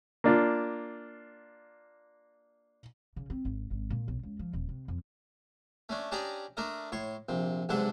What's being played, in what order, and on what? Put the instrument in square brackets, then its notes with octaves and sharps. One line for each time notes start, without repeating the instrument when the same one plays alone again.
[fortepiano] A#3 D4 F4
[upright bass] C#3
C4
G#1
G#1
A#2
B1
C#2
F3
D#1
C3
F2
[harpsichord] A3 C#4 D4
C#4 D4 G4 D5 D#5 A#5
A3 D4 A#4 D#5
A2 C#5 C6
A#1 C3
B1 G#2 C3 D4 A4 F#5